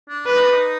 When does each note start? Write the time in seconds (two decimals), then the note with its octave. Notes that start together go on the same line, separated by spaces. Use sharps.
0.09 D4
0.27 D4 B4
0.36 D#4
0.44 D4
0.52 D#4